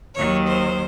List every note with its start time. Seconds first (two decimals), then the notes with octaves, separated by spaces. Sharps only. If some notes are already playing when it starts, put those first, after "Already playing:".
0.14 D#2 D#3 F#3 C#5
0.46 C5